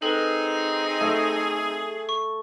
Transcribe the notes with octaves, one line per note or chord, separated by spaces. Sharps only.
C4 D#4 G#4 A4 B4
A3 C#6
C#6